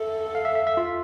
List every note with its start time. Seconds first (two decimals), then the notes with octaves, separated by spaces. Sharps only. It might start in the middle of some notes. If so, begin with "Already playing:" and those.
Already playing: A4 E5
0.35 F5
0.45 E5
0.55 E5
0.67 E5
0.77 F4